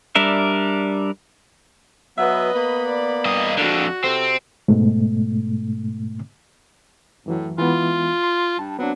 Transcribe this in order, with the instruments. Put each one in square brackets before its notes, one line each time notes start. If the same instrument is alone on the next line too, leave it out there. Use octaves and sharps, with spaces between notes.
[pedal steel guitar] G3 D4 A#4 E5
[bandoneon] F#3 B3 [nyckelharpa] B4 D#5 [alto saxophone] E5
[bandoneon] A#3 B5 [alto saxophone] B3
[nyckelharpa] D5
[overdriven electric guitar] G2 D#5
[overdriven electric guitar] F2 D3 [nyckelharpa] F#4
[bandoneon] C3 [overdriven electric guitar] C4 [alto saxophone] A4
[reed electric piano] G#2 B2 A3
[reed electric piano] F#2 E3 F#3 [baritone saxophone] A2
[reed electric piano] E3 G#3 B3 [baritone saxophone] F4
[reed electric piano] C6
[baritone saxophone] G2 [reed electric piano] A5
[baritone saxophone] F#3 [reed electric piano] B3 C4 D4